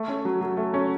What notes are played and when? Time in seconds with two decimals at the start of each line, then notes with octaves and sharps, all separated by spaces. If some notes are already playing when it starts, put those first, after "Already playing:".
Already playing: A3
0.08 C#4
0.25 F#3
0.41 F#3
0.57 A3
0.74 C#4